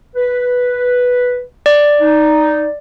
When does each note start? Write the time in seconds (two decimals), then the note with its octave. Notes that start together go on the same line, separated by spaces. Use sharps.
0.15 B4
1.66 D5
2.00 D#4